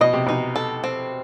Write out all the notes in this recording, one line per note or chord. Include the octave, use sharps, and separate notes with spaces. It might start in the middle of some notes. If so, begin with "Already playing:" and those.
B2 D#5
C3
B2 D#4
A4
C4